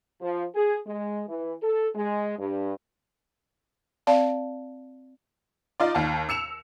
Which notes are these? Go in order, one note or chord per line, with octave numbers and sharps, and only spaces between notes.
F3
G#4
G#3
E3
A4
G#3
G2
C4 D5 F5 A5
D#4 F4 D5
D#2 F5 A5
E6 C#7 E7 F7